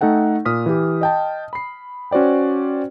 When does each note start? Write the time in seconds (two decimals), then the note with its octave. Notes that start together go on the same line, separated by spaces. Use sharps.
0.01 A3 D#4 A4 F#5 G5
0.45 A#2 D#6 F6 B6
0.66 E3 G4
1.01 D#5 G5 A5
1.53 B5 C7
2.11 C#4 F#4 C5 D5 G5